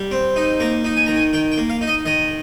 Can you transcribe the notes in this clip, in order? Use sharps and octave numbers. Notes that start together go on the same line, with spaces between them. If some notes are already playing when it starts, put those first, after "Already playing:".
Already playing: G3
C4
D#4
A#3 A#5
D#4
G#5
D#3 A#5
G#5
D#3 G5
G5
A#3
F5
D#4
D#5
D#3 D#5